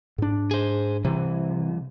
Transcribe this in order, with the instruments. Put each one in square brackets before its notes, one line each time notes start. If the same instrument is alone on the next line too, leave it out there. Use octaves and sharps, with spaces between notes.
[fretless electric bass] G#2 D4
[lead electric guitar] G#4 C5
[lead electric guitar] C2 E3 [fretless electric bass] C3